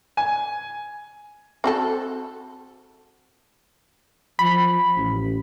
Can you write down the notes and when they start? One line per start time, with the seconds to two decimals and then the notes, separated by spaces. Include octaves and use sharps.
0.17 G#5
1.64 C4 F#4 A4
4.39 F3 B5
4.96 A1